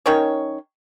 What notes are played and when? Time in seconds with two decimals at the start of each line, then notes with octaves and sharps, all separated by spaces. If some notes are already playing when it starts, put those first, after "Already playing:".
0.06 D#3 C#4 C#5